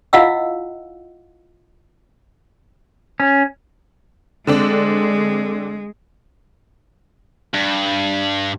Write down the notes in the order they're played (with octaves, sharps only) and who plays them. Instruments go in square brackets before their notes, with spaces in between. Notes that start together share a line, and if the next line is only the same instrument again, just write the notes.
[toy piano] E4 F4 D#5 F5 F#5 E6
[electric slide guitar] C#4
[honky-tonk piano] D3 C4 D4 [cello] G#3
[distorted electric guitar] G2